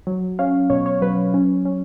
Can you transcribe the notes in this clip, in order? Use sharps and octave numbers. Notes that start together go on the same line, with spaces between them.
F#3
C#4 F5
B2 C#5
C#5
F#3 B4
C#4
C#4